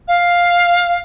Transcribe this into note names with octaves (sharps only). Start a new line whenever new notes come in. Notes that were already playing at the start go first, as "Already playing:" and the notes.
F5